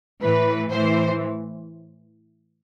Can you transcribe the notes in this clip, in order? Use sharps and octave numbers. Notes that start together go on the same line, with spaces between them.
A2 E3 B4
A2 E3 C5